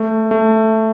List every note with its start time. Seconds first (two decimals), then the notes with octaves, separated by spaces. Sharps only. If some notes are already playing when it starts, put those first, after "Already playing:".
Already playing: A3
0.31 A3